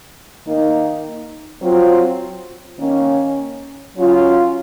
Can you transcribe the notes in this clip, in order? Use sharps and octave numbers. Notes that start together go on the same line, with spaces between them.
D#3 A#3 D#4
F#3 C4 F4
D#3 A#3 C#4
F#3 C#4 F4